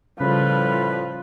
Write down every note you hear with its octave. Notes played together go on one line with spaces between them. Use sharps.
A2 C#3 F3 G3 B4 B5